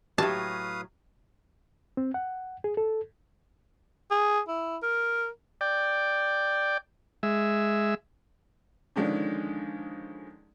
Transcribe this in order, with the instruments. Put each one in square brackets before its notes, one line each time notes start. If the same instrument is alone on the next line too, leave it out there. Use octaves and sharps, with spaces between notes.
[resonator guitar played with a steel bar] A2 F#3 [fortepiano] G4 [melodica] B4 F5 D#6 [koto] A5
[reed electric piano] C4
F#5
G#4
A4
[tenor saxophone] G#4
E4
A#4
[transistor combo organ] D5 G5
G#3 E5
[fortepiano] D3 D#3 F3 G#3 C#4 D4